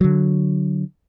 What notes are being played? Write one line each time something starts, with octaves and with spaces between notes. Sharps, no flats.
D3 F#3